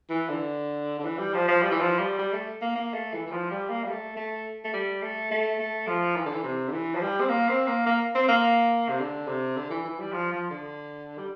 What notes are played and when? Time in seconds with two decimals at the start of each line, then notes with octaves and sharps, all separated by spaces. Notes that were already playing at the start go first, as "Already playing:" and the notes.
0.10 E3
0.29 D3
0.99 D3
1.04 E3
1.19 G3
1.34 F3
1.48 F3
1.62 G3
1.71 E3
1.80 F3
1.99 G3
2.19 G3
2.33 A3
2.61 A#3
2.75 A#3
2.94 A3
3.13 E3
3.26 E3
3.32 F3
3.51 G3
3.69 A#3
3.84 G3
3.89 A3
4.16 A3
4.64 A3
4.73 G3
5.02 A3
5.31 A3
5.60 A3
5.87 F3
6.16 E3
6.25 D3
6.33 E3
6.44 C3
6.68 D3
6.72 E3
6.95 F3
7.01 G3
7.20 C4
7.29 A#3
7.49 C4
7.67 A#3
7.86 A#3
8.15 C4
8.28 A#3
8.89 C3
9.00 D3
9.27 C3
9.57 D3
9.70 E3
9.85 E3
9.99 G3
10.12 F3
10.32 F3
10.50 D3
11.18 G3